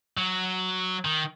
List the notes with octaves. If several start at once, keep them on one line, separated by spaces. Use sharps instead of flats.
F#3
D#3